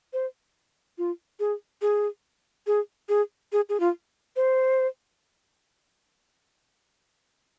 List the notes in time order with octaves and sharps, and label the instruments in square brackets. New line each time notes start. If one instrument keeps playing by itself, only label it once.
[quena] C5
F4
G#4
G#4
G#4
G#4
G#4
G#4
F4
C5